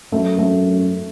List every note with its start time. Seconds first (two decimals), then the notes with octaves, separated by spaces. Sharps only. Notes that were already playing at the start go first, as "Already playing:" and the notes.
0.12 F#2 A3
0.38 A3